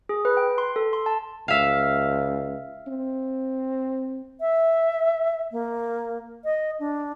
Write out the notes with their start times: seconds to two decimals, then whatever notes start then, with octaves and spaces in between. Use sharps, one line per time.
0.09 G#4
0.25 B4
0.37 G5
0.58 C6
0.76 A4
0.93 C6
1.06 A5
1.48 C#2 E5 F5
2.87 C4
4.40 E5
5.52 A#3
6.44 D#5
6.80 D4